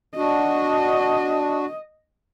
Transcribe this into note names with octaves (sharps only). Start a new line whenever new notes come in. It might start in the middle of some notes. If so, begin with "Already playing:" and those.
D4 F#4 D#5